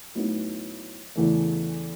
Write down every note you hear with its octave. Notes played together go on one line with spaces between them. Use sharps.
A2 F#3 B3 D#4
E2 C#3 E3 A3